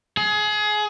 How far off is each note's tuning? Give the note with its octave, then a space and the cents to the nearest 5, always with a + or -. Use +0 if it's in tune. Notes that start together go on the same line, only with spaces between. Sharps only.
G#4 +25